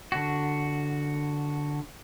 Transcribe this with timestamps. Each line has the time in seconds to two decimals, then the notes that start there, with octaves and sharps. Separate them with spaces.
0.12 D3 F#4